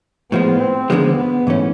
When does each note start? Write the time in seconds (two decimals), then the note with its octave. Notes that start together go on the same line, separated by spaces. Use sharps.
0.32 A2 F3 G#3 B3
0.60 C4
0.89 D#2 D3 F3 G#3 B3
1.18 B3
1.47 G#2 E3 A3 C#4